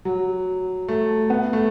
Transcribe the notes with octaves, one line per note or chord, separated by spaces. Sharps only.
F#3
A3
B3
A3